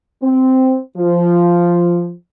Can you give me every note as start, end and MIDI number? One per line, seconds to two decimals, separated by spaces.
0.23 0.78 60
0.97 2.13 53